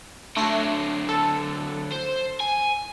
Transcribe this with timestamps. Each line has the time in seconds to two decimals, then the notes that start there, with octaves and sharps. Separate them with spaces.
0.37 D3 F#3 A3 A#6 C7
1.09 A4
1.92 C5
2.40 G#5